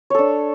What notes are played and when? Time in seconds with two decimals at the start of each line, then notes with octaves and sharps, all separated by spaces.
0.10 C#5
0.14 A4
0.19 D4